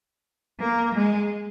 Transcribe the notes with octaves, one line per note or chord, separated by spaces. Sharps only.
A#3
G#3